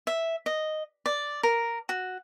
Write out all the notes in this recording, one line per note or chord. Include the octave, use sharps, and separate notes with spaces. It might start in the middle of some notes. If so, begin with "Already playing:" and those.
E5
D#5
D5
A#4
F#4